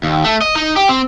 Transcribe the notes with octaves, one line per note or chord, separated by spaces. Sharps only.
D#2
A3
D#5
D#4
G4
C4